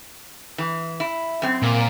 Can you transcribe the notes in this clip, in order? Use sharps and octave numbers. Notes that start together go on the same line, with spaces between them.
E3
E4
F#2 C4
A#2